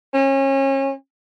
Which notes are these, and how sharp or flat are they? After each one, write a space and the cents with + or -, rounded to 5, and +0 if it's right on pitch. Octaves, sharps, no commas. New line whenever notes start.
C#4 -30